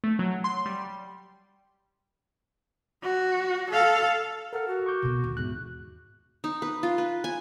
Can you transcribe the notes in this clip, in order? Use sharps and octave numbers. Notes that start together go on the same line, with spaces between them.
A3
F#3
C6
G3
F#4
A4 F5
A4 A#4 F#5 F6
F#4
C#6 D6 G6
B2 B3
D#2
E2 G#2 F#6
D#4
B4
F4
B4
G#5